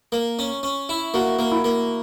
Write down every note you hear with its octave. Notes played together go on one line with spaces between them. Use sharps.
A#3
C#4
C#4
E4
A#3 F#4
A#3
E4
A#3